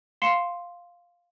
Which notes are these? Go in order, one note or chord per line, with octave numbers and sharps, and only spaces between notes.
F5 C6 C7 C#7 E7